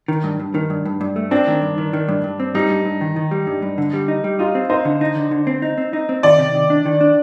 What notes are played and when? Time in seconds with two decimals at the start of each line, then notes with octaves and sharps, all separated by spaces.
0.08 D#3
0.24 G2
0.40 G2
0.55 D#3
0.70 G2
0.85 G2
1.01 G2
1.16 A3
1.31 C4 D4
1.47 D#3
1.62 G2
1.78 D#3
1.93 D#3
2.08 G2
2.24 G2
2.40 C4
2.55 G3 D#4
2.70 G2
2.85 G2
3.01 D#3
3.16 D#3
3.31 G3
3.47 G2
3.62 G2
3.78 D3
3.93 G3
4.08 D#4
4.24 G3
4.39 D#4 F4
4.55 C4
4.70 D#4 C5
4.85 D3
5.01 D#4
5.16 D3
5.31 D3
5.47 C4
5.62 D#4
5.78 C4
5.93 D#4
6.09 C4
6.23 D#3 D5
6.39 C3
6.55 D#3
6.70 D4
6.86 D#3
7.01 D4